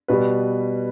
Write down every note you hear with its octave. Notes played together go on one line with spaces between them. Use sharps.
B2 G3 B4